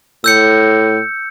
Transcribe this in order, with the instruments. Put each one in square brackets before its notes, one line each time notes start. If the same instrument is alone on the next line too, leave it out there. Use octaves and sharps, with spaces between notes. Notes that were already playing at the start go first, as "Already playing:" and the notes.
[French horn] A2 [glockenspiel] E6 G6 C#7